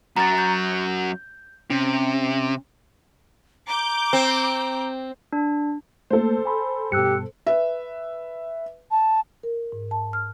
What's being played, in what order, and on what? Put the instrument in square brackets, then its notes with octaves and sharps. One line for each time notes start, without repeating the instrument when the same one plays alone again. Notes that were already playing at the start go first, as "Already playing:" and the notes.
[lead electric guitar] F#2 F#3 [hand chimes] A#5 A6
[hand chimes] G6
[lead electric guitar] C3 [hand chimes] C#4
[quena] A#5 [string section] D6 G6
[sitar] C4
[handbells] D4
[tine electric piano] A3 A#3 [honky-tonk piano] A4 C5
[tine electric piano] G#5 B5 C6
[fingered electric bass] G2 B2 [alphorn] G4 [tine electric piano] E6 F#6 C#7
[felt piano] B4 E5
[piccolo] A5
[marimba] A#4
G#2
A5
F6